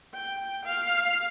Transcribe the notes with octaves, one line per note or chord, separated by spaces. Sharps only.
G5
F5